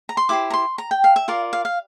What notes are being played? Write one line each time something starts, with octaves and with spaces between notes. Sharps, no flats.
A#5
C6
E4 G4 C5 D6
A#5
C6
A#5
G5
F5
E5
F4 A#4 D5 F5
F5
F5